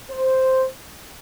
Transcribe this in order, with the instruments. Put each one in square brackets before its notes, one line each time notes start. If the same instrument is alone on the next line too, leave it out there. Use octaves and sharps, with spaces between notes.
[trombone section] C5